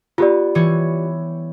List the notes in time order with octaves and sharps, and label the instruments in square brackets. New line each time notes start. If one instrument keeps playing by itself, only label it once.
[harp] B3 [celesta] F4 G4 D5
[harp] E3 G3 C#5